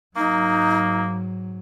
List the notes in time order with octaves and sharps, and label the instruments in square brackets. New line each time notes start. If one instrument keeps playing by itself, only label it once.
[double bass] G#2 F#3 [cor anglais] A#3 [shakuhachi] D#4